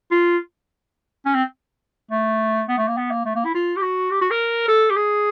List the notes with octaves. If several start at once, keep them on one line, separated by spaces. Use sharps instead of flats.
F4
C#4
C4
A3
B3
A3
A#3
B3
A#3
A3
A#3
E4
F4
G4
F#4
G4
F#4
A#4
A4
G4
G#4